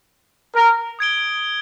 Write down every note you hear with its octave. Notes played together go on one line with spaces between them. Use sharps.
A#4
D#6 G#6 D7 G7